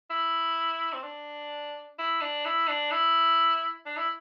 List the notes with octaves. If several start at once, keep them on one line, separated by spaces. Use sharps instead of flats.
E4
C4
D4
E4
D4
E4
D4
E4
D4
E4